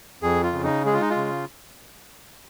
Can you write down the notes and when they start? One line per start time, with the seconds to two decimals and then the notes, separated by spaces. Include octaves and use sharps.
0.22 F2 G#4
0.43 F4
0.53 C#3
0.64 D#4
0.85 G#3 G#4
0.93 F4
1.01 D#4
1.10 F4
1.16 C#3